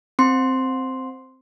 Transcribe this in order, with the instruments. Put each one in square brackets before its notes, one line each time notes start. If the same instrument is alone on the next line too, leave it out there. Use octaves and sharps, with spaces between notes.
[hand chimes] C4 C6